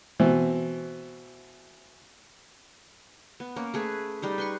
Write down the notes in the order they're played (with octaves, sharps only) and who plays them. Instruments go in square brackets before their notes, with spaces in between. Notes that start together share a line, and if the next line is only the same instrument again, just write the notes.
[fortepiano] B2 E3 C4
[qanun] B3
A#3 C#4
A3 G#4 B4
G3 D#4 G#4
B4 C6 C#6